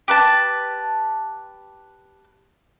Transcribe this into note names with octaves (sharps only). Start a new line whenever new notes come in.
G4 B4 A5